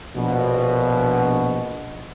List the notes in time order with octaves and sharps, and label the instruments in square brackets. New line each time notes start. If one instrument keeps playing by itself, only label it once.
[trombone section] A#1 B2